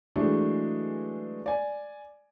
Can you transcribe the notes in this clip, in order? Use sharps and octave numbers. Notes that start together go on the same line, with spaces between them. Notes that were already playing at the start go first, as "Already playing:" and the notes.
E3 F#3 G#3 A3 D4
D5 G#5